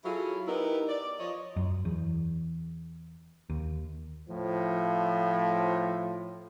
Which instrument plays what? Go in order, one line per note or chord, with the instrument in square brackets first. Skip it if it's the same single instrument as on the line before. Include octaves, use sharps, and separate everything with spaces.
[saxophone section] F#3 E4 F4 G#4 A4
B3 D#4 E4 G4 A#4
D5
F3 C#5 D#5
[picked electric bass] F#2
E2
D#2
[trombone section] A2 F3